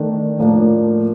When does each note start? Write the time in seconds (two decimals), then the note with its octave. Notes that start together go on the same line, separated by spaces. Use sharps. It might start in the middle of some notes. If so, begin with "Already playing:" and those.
Already playing: D#3 A3 D4
0.39 A2 F3 A#3 D4